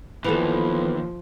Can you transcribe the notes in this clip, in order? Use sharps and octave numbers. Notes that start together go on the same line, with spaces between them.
D#2 E3 F3 B3 A4